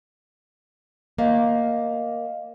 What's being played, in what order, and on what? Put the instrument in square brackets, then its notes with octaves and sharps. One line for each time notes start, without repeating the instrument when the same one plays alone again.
[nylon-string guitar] A#3 [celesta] D#5 F5